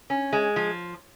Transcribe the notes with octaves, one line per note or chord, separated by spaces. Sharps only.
C#4
G#3
F3